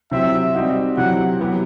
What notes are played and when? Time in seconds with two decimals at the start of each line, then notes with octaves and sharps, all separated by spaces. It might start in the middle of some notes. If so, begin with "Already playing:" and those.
0.11 C3 F#3 C4 E4 E5
0.54 G3 C4 D#4 F#4
0.97 C3 F#3 C4 E4 G4 F#5
1.40 F#3 B3 E4 G4